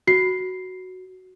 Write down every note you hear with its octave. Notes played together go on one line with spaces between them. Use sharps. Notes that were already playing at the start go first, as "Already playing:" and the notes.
F#4 C7